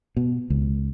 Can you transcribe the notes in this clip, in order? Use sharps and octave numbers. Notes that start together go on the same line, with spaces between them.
B2
C#2